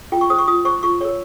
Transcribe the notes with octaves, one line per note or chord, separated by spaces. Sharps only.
F4 G5
C#6
C5 D#6
C#6
F4 D#6
C5 C#6
F4 C#6
A#4 C#5